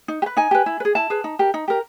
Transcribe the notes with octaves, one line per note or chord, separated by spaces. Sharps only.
D#4
G4
B4
D#4 G#5
G4 B4
E4
B4
G#4
E4 A5
G#4 B4
D#4
G4 A#4
D#4
G4 A#4